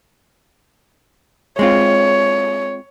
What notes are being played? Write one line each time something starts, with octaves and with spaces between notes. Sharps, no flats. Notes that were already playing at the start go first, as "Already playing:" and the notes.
G#3 C4 F4 C#5